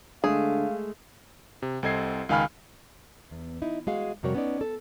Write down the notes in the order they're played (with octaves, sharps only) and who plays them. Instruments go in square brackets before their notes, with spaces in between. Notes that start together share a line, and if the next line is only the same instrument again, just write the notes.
[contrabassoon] D3 [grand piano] G#3 A3 [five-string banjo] G#4 [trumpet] F5
[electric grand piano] C3
C2 C4 A4 D#5 G#6 C7
C#2 D#3 F5 G#5 B5 F6
[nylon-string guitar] E2
D#4 E4
G#3 F#4 G#4 F5
F2 C3 G3 F#4 A#4 C#5
B3 C#4 D#4 D5
A4